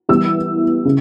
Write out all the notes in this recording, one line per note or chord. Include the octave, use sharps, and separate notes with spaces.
E3 G3 B3 E4 E6
C#3